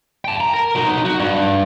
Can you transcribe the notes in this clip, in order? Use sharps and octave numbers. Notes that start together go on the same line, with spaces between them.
G5 A5
A#5
A#4
F#3 D#4
F#4
G2